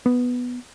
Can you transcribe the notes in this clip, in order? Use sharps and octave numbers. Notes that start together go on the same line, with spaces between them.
B3